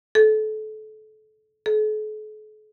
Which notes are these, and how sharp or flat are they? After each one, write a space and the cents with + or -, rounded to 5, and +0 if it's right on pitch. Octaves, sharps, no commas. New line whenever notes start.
A4 -30
A4 -45